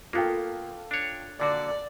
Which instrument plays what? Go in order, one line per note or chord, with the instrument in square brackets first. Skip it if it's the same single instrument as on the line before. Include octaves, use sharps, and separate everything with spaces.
[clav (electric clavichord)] A#3 B3 [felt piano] F4 A4 G5
[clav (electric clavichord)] D4 C#5
[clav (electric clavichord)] A#2 D3 F#4 [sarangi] D5